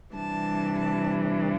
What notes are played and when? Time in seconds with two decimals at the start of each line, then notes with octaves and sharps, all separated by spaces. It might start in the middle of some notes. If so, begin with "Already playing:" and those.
0.14 C3 E3 G3 D4 A5
0.78 A5